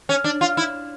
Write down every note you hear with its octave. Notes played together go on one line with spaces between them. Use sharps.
C#4
D4
F4
E4